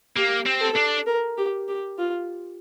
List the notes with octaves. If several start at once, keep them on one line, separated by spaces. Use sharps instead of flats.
A#3 G4
C4
A4
D4
A#4
G4
G4
F4